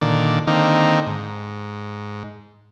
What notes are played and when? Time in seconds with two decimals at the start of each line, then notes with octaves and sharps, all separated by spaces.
0.01 A#2 D3 D#3 D5
0.47 D3 D#3 A#3 C4 D#4
1.06 G#2